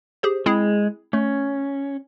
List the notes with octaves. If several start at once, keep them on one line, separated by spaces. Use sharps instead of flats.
G4 G#4 C5
G#3 C4 E4 G#4
A3 C#4